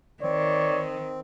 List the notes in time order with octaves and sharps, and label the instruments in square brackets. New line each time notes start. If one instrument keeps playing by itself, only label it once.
[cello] D#3 [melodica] C4 [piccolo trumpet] C#5 [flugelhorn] D5